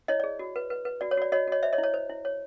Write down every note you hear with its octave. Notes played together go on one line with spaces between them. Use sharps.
E4 C#5 D#5
D5
G#4
F#4
B4
B4
B4
F#4 D5
C#5
F#4 D5
F#4 C#5 D#5
F#4 C#5 D#5
C5 D5 E5
C#5 D#5
E4
C#5
C5
E4
C#5